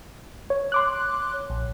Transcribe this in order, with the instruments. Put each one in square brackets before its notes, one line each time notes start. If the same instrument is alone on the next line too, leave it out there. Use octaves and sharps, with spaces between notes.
[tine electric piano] C#5
[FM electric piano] C6 D6 F#6
A#1